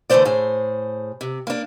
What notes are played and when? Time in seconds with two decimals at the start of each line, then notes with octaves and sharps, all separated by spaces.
0.10 D3 E3 G#3 A3 C5 D5
0.25 A2 G#4 C5
1.21 C3
1.47 A#3 D4